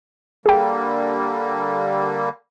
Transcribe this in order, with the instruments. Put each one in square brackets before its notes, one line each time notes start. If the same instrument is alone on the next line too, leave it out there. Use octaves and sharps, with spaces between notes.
[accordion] D3 G3 A#3 [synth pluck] G#4 G5